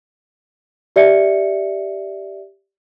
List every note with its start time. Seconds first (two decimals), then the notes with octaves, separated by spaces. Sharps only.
0.96 G4 D5 E5 C#7